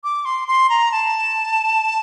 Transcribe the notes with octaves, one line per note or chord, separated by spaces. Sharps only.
D6
C6
C6
A#5
A5